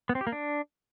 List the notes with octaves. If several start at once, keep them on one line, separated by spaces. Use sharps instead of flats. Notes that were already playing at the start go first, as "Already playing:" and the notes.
B3
C4
G4
A#3
D4